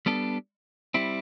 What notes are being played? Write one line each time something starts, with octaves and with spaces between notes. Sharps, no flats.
G3 B3 D4 A4
G3 C4 E4